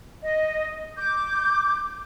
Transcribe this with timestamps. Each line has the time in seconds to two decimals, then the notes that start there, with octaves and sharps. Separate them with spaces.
0.23 D#5
0.96 D6 G6